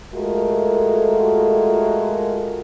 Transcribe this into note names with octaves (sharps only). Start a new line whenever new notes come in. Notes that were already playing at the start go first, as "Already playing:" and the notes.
G#3 A3 F4 F#4 A4 A#4